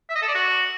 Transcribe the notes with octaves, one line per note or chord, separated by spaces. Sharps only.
E5
D#5
A4
D5
F#4